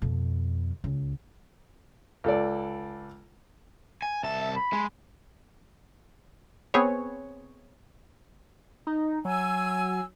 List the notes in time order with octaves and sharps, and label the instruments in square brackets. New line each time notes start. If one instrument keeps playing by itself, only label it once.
[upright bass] F2 B2
C#2
[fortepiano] C#2 A4 D5
[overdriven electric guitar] G#5
[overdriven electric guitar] C2 A5 [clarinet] E5
[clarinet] E5
B5
[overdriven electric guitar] G#3
[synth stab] B3 C4 G#4 B4 C#5
[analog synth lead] D#4
[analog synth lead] F#3 [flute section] G#5 E6